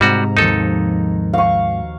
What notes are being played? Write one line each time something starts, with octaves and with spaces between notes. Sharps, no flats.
G#2 C3 G3 F#4 A#5
D#2 D#3 F3 D#4 A4
F#4 F5 C#6